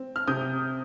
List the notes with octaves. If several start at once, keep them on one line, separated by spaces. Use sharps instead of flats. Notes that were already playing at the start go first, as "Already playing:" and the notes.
Already playing: C4
F6
C3 D#6 G6